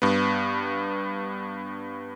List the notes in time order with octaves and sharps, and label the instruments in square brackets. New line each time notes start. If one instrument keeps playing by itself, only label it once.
[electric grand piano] G2 B3